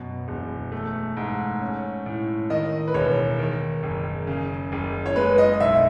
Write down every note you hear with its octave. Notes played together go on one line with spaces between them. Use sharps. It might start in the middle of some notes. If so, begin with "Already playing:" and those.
Already playing: F#2 B2
E1
A3
G#2
C#4
A2
D#3 D#5
B4
E1 C#5
D#3
F#1
C#3
F#1
C#5
G#3 B4
D#5
B1 E5